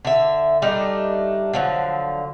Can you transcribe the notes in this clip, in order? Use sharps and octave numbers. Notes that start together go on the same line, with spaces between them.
D3 E5
G3 A3 D4 D#4
D3 F3 F#3